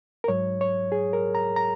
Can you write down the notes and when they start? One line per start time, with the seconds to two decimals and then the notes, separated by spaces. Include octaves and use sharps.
0.24 A#4
0.28 G#2 F#3 C#5
0.61 C#5
0.92 G#4
1.13 A#4
1.35 A#5
1.56 A#5